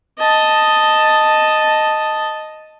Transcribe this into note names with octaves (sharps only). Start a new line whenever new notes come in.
D#5 A5